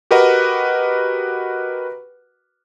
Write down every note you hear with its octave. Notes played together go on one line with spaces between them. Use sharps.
F#4 G4 A#4 B4 D#5 F#5